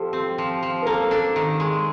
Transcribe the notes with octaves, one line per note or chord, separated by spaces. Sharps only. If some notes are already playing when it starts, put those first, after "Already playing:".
Already playing: F3 G4 A4
C4
F3
F3
A#4
A#3 A4
D4 A4
D#3
G#3